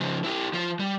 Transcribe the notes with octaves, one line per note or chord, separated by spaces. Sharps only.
C#3 F3
E4 G4
F3 F4
G3